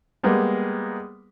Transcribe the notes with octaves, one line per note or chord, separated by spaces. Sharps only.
G3 G#3 A#3 B3